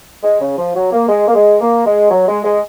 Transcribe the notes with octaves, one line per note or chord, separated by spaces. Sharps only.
G#3
C#3
F3
F#3
A#3
G#3
A#3
G#3
A#3
G#3
F#3
G#3
G#3